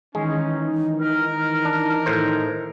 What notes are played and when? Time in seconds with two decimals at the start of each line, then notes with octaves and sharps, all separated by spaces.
0.15 D#3 E3 G#3 C#4 D#4
1.00 A#4 F6
1.65 D4
2.06 A2 C5